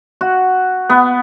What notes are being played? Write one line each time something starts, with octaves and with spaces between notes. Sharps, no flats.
F#4
B3